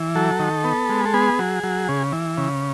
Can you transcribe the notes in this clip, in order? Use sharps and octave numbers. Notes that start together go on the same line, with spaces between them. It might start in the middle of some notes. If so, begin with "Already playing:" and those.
Already playing: E3
F#3 A4
D#3
B3
G#3
A4
B3 G#4
F#3
F#3
C#3
E3
C#3